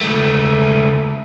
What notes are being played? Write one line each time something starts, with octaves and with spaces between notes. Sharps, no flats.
C#2 A3